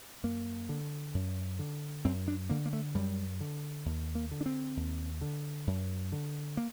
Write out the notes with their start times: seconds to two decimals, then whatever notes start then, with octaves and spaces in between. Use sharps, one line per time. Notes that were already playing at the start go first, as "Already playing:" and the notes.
0.23 F#2 A#3
0.69 D3
1.14 F#2
1.59 D3
2.05 F#2 C4
2.28 D4
2.50 D3 A#3
2.66 A#3
2.73 A3
2.95 F#2 G3
3.41 D3
3.86 D#2
4.15 A#3
4.31 D3
4.41 D4
4.46 C4
4.77 D#2
5.21 D3
5.67 F#2
6.12 D3
6.57 A#3